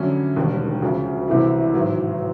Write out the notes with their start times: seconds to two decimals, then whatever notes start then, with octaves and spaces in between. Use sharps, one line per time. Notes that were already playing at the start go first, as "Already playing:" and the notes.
Already playing: F2 D3 F#3 A3 C#4
0.36 E1 D#2 D#3 G3
0.82 D2 C#3 F3
1.28 C2 C3 E3 A3
1.74 A1 G#2 D#3 F#3